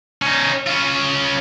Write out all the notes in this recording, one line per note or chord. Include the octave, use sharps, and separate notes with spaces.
C#4 D#4
C#4 F4